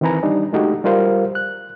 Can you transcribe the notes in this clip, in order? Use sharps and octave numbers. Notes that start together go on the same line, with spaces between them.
D#3 E3 C4 B4 G#5 A#5
G3 D4 D#4
G#3 A3 D#4 F#4 G4
G3 F4 A#4 C5 F5
F#6